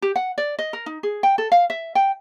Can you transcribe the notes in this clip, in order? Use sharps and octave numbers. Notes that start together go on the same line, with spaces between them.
G4
F#5
D5
D#5
A#4
D#4
G#4
G5
A4
F5
E5
G5